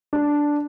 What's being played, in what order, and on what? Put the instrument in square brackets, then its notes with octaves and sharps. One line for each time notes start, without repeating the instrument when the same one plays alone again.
[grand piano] D4